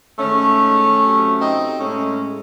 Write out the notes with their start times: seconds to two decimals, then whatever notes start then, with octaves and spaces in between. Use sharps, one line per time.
0.19 G#2 D#3 G#3 A3 C#4
1.00 C3 F#3
1.39 C4 D#4
1.78 A2 G#3 A3 C#4